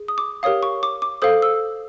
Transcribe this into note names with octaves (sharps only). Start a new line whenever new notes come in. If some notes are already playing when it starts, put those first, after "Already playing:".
Already playing: G#4
D#6
D6
G4 A#4 C#5 F5 D#6
C#6
D6
D6
A4 C5 F5 D#6
E6